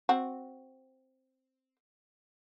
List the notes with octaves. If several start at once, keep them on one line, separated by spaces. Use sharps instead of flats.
C4 F#4